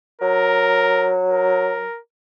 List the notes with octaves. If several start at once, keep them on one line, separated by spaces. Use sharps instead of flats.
F#3 A#4
A#4